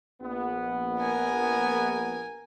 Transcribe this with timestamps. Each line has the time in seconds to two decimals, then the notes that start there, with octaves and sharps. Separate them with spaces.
0.21 A#1 B3
0.98 A#4 G#5